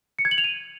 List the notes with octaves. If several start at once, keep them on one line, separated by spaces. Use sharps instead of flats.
C#7
G#6
F#7
F7
D#7